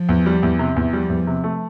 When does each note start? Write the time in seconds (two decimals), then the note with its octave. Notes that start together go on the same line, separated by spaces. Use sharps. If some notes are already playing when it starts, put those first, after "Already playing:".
Already playing: F3
0.09 E2
0.26 G3
0.43 E2
0.59 C3
0.76 E2
0.93 F3 G3
1.10 E2
1.27 C3
1.44 A3